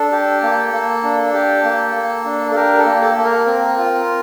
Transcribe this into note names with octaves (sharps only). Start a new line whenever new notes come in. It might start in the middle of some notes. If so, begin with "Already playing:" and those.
Already playing: D4 A4
G4
A#3
A#3
D4
G4
A#3
A#3
D4
A4
G4 A#4
A4
A#3
A4
A#3
A#4
C4
F4